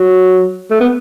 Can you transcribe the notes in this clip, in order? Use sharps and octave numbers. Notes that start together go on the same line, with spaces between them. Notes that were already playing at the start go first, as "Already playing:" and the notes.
Already playing: F#3
A3
B3